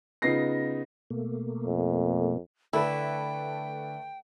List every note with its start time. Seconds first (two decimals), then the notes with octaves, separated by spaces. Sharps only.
0.22 C#3 B3 D#4 F4 A#6 C7
1.10 B2 A3 A#3
1.66 F2
2.73 D3 A3 E4 A4 B4 G5